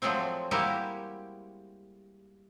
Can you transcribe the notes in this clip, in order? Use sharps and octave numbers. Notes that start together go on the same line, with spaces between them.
F3 F#3 G#3 A3 C4
G3 G#3 A#3 E4 F#4 G4